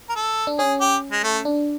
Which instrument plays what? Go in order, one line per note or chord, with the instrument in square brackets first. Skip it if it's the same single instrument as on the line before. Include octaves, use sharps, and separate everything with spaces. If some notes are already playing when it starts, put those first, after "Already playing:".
[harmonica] A#4
A4
[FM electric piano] D4
[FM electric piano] C#4 [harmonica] G#4
[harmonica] G4
G#3
A3
[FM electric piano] D4